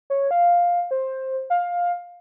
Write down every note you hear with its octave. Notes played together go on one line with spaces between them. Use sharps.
C#5
F5
C5
F5